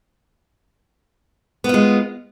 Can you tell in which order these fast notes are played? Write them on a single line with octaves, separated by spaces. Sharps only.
B3 F4 G#3